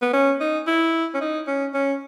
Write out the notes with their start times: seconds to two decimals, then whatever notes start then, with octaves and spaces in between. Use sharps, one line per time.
0.02 B3
0.13 C#4
0.40 D#4
0.67 E4
1.14 C#4
1.21 D#4
1.47 C#4
1.74 C#4